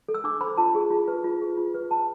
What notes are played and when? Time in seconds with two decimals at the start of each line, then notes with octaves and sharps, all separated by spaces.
0.08 A4
0.14 E6
0.24 D4 D6
0.41 C5 B5
0.57 F4 A5
0.75 G#4
0.90 F4
1.08 B4
1.24 F4
1.42 G#4
1.57 F4
1.75 B4
1.90 F4 A5